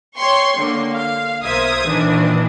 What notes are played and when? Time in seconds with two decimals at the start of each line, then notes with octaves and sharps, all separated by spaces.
0.17 C#5 G5 C6 C#6
0.57 D3 A#3
0.93 F5
1.42 B1 A#4 C5 E5 D#6 G#6
1.85 A#2 D#3 E3 D4